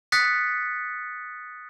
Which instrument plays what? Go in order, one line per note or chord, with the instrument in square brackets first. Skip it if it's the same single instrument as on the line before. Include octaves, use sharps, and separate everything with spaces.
[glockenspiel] D#6 F#6 A6 B6 C#7